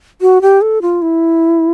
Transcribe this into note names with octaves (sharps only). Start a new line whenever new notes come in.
F#4
G4
A4
F4
E4